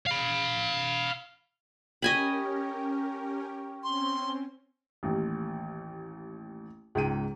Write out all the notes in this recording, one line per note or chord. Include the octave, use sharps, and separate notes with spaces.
F5 B5
C#4 G4 A#4 D#5 G5 G#5 B5 C#6
C4 C#4 C6
A1 D#2
C#2 G#2 G5 D#7